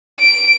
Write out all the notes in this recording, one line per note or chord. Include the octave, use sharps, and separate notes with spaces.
D7